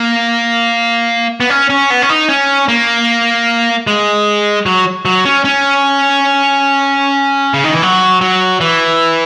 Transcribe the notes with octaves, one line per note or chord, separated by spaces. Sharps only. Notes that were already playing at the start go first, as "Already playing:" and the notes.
Already playing: A#3
B3
C#4
C#4
B3
C#4
D#4
C#4
A#3
G#3
F#3
F#3
C#4
C#4
C#3
D#3
E3
F#3
F#3
E3